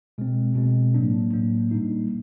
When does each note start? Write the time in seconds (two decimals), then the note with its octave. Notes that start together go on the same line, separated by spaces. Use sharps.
0.18 B2 G#3 C4
0.55 B2 G#3 C4
0.94 A2 F#3 A#3 D4
1.33 A2 F#3 A#3 D4
1.71 A#2 G3 A#3 D#4